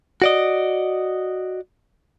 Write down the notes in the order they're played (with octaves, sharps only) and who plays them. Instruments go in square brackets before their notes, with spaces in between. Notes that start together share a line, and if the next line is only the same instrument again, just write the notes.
[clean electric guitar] F#4 D5 D#5